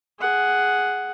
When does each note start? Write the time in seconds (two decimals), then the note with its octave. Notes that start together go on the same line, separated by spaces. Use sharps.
0.20 G#4 F#5